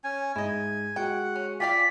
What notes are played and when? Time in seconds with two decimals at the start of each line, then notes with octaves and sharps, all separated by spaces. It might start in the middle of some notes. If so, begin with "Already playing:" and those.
0.04 C#4 G#5
0.36 G#2 G#3 E4 D#5 G#5
0.96 G#3 F#4 F#5 G5
1.36 C#4
1.60 F4 D5 F5 G5 G#5 B6